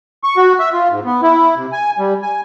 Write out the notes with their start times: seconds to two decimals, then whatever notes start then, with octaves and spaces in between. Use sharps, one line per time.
0.24 C#6
0.37 F#4
0.60 E5
0.73 F4
0.90 G#2
1.05 B3
1.22 E4
1.56 C3
1.72 G#5
1.99 G3
2.22 G#5